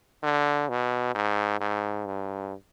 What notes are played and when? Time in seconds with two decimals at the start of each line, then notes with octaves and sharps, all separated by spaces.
0.23 D3
0.69 B2
1.15 G#2
1.60 G#2
2.06 G2